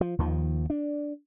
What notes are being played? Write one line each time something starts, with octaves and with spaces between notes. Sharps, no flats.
F3
D#2 D#3 F3
D4